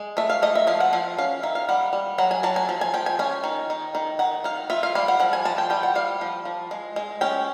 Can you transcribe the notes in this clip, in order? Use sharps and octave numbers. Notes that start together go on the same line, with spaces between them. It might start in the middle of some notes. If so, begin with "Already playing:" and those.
Already playing: G#3
A3 E5
F5
A3 D#5
E5
F3 F5
F#5
F3 F5
C#4 F5
D#3 E5
F5
G3 F#5
G3
F#3 F#5
G#5
F#3 A5
G#5
F3
G#5
F3 G5
G#5
C#4 G#5
D#3
D#3
D#3
D#3 F#5
D#3 F5
F4 E5
F5
G3 F5
F#5
F3 F#5
G#5
F3 A5
G5
G3 G5
F#5
G3 F5
F3
F3
G#3
G#3
C#4 G5